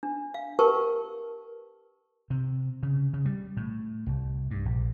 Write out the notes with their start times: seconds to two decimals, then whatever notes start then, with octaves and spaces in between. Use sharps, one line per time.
0.03 D4
0.34 F5
0.59 G4 A#4 B4 G5 A5 C#6
2.30 C3
2.83 C#3
3.13 C#3
3.26 G3
3.57 A2
4.06 C2
4.51 G2
4.65 A#1